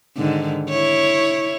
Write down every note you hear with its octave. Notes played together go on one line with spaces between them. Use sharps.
G#2 D3 D#3
E4 C#5